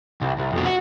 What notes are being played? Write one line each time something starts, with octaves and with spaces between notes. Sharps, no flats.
C2
C2
F2 B2
F#4